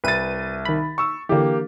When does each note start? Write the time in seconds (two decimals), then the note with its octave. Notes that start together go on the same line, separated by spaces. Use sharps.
0.04 C2 B4 A6 D#7
0.65 D#3 B5
0.98 C#6 E6
1.29 D3 E3 A#3 G4